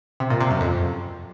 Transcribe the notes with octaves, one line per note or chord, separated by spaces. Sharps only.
C3
A#2
C3
F#2
F2